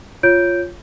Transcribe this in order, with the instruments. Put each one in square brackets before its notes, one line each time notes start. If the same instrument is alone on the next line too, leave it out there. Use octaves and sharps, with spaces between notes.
[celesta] F4 C#5 G6 D7